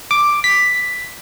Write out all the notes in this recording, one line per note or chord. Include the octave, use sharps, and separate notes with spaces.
D6
B6